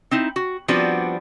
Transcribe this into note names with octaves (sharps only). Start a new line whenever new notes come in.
C4 D#4 E4
F#4
F3 G3 B3 C4 D4 F#4